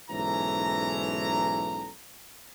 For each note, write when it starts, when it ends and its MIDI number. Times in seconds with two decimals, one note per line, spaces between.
0.11 1.91 35
0.11 1.91 44
0.11 1.91 52
0.11 1.91 61
0.11 1.91 69
0.11 1.91 82